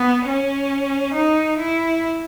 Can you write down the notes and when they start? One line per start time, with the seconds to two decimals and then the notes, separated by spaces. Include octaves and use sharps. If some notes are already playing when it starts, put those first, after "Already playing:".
Already playing: B3
0.27 C#4
1.14 D#4
1.58 E4